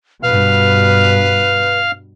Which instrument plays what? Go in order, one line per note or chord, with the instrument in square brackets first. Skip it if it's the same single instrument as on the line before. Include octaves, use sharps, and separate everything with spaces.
[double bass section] G2 B2 [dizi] B4 [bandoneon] F5 F6